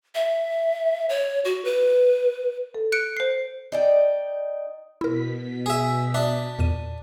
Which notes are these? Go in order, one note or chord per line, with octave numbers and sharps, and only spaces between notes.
E5
C#5
F#4
B4
A4
F#6 C#7 D7
C5 C7
D#4 D5 G5
B2 E4 A#4 B6
G#4 E5
D4 E5 D#6
E2 A#2 D#7